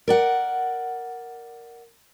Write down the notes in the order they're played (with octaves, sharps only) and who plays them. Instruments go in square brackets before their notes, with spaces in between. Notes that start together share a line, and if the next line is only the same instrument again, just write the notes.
[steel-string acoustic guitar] A#4 D5 F#5